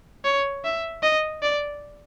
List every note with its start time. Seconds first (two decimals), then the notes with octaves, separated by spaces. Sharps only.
0.25 C#5
0.65 E5
1.03 D#5
1.43 D5